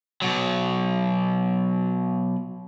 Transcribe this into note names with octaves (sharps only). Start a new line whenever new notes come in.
B2 F#3